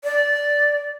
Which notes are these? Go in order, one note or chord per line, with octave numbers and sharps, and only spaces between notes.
D5